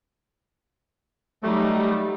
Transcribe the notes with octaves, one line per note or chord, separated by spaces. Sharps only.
F#3 G3 A3 D#4